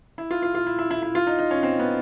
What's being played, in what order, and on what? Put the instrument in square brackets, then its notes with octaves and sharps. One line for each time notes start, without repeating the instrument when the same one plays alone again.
[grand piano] E4
F4
F4
F4
E4
E4
E4
E4
F4
D#4
D#4
C#4
C4
B3